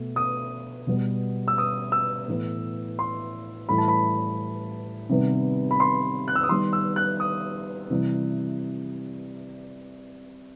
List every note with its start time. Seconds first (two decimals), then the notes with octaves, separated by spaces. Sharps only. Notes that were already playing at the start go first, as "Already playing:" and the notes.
Already playing: B2 A3
0.16 D#6
0.87 B2 G3 B3
1.48 E6
1.58 D#6
1.92 E6
2.28 A2 E3 B3
2.99 C6
3.69 A2 E3 G3 B5
3.78 A5
3.88 B5
5.09 C3 D#3 G3 B3
5.71 B5
5.80 C6
6.28 F#6
6.35 E6
6.43 D#6
6.49 D#3 G3 B3 C6
6.73 E6
6.96 F#6
7.20 D#6
7.90 C3 E3 G3